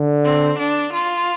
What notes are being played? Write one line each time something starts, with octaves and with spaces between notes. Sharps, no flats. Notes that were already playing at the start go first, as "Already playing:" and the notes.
Already playing: D3
C4
D4
F4